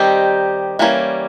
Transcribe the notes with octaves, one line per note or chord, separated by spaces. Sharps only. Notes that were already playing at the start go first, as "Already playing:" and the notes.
Already playing: D#3 G3 C4 D#4 G4
E3 G3 A#3 C#4